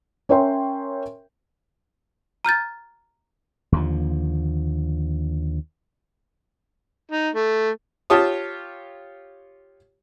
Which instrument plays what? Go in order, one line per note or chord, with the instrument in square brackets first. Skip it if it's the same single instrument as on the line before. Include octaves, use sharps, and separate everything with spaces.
[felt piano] C#4 A#4 C#5 E5 G5 C6
[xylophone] A#5 F6 G6 A6
[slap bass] D#2 D3 F3
[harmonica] D#4
A3
[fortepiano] F4 G4 C#5 A5 D#6